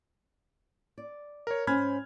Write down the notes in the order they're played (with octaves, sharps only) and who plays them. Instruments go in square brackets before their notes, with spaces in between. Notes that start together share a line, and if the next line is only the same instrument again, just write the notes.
[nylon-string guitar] D5
[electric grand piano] A#4 C#5
[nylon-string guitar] G#2 C#4 C5 [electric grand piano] B5 F6 G#6